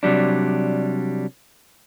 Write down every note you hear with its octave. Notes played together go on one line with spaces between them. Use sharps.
C3 F#3 G3 D4